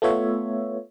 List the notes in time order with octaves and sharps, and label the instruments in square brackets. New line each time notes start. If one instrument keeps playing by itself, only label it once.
[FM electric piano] A3 B3 F4 C#5 E5